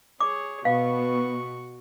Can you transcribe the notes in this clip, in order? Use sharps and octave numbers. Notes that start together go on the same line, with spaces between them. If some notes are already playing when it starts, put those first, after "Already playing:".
G#4 C#5 D6
B2 B3 F#4 F5 C#6